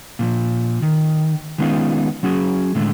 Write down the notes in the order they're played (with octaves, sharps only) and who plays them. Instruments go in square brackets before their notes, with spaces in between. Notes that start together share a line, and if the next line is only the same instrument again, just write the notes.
[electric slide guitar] A#2 D#3 F3
D#3
D#3 G#3 B3 C#4 D#4 F4
F#3 C#4 F#4 G#4
A2 D3 G#3 A3